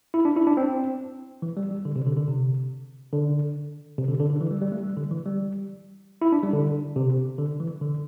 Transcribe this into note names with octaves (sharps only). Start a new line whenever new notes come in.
E4
D4
E4
D4
C4
E3
G3
G3
D3
C3
D3
D3
C3
D3
C3
D3
D3
D3
E3
G3
G3
A3
G3
D3
E3
G3
E4
D4
G3
D3
C3
D3
E3
D3